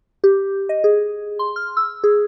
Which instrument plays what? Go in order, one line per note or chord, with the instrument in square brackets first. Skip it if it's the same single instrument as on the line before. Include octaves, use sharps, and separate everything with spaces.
[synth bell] G4
D#5
G#4
C6
F6
E6
G#4